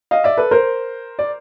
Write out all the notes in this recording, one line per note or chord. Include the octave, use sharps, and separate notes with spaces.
D#5 F5
D5 E5
A4 B4
A#4 C5
D5